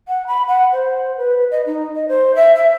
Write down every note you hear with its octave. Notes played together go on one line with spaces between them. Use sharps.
F#5
B5
F#5
C5
B4
D#5
D#4
D#5
C5
E5
E5